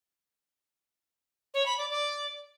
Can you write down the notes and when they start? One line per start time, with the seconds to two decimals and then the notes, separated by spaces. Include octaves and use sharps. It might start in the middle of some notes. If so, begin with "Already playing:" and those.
1.54 C#5
1.66 B5
1.78 D5
1.90 D5